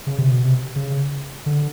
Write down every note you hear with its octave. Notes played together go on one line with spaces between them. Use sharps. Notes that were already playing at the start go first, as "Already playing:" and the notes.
C#3
C3
B2
C3
C#3
D3